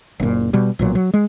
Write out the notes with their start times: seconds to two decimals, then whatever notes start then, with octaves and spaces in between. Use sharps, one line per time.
0.20 F#1 A#2
0.53 B2 G3
0.79 B1 A#2 F#3
0.95 F#3
1.14 G#3